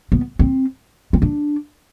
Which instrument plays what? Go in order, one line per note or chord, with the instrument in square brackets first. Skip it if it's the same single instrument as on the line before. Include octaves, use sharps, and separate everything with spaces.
[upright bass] B3
C4
C4
D4